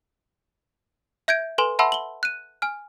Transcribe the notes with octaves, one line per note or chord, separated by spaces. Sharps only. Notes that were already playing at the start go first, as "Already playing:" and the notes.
E5 G6 G#6 D7
A4 B4 G#5 C6 E7 F#7
E5 F#5 A5 B5 C6 E6
F#7 G7
F#6 D#7
G#5 F6